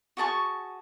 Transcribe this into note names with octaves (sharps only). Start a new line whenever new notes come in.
F#4 G#4 A5 C#6